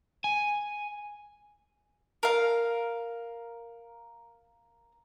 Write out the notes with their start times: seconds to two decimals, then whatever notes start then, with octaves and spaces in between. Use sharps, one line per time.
0.24 G#5
2.23 A#4 F5